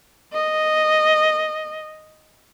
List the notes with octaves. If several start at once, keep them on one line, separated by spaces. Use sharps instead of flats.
D#5